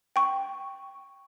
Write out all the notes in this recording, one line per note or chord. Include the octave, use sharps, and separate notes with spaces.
G5 C#6